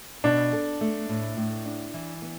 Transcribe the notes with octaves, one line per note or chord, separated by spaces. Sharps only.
B2 D4
A4
A3
A2
A2
D4
E3
B3